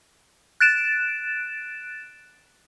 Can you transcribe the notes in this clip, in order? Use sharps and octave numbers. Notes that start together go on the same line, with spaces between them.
F#6 A6 D7 E7